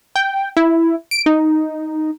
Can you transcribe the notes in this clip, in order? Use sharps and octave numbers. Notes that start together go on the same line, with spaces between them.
G5
E4
D7
D#4